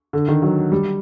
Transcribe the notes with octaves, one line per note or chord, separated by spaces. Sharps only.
D3
D#3
F#3
G3